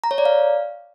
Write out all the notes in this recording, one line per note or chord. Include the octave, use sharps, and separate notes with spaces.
A#5
C#5
D5
F5